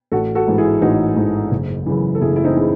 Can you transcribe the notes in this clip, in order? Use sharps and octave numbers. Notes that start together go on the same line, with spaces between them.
A1 F#4 A4
F#4 A4
G#2 E3
E4 G#4
A1 D#4 F#4
G#2 E3
F#1
F#2 C#3 E3
A4
F#1 E4 G#4
E4
C4 D#4
C#3 E3